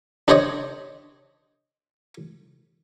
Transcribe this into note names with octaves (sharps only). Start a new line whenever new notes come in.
D4 G4 C5 C#5 D#5